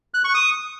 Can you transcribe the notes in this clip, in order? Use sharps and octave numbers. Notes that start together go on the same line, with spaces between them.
F#6
C#6
D#6